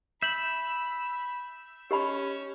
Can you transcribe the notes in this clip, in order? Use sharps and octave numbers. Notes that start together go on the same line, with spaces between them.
E5 B5 G6 F#7
C#4 G4 D#5 B5